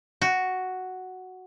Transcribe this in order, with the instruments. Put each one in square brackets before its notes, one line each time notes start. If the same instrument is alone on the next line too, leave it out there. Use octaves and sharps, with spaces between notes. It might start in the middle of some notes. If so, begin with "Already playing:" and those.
[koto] F#4